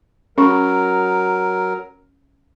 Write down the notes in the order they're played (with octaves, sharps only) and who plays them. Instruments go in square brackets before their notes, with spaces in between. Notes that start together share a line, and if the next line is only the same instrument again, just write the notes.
[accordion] F#3 A#4 [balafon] C#4 C#6